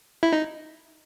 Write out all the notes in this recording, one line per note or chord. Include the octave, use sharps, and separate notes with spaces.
E4
D#4